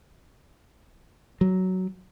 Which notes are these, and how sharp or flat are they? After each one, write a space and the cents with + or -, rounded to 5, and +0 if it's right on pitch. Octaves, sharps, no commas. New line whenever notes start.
F#3 +10